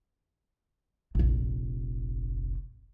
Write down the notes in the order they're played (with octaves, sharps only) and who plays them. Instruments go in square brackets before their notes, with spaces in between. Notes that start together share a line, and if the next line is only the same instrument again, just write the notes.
[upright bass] F1 A#1